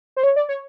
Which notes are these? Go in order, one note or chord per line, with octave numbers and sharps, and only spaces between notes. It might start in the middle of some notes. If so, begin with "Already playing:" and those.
C5
C#5
D5
C#5